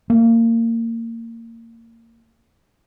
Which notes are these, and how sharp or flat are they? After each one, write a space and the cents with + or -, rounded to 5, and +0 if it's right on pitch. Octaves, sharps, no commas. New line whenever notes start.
A#3 -25